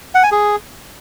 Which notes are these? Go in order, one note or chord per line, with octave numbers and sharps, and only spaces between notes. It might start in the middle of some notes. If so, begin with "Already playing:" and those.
F#5
G#5
G#4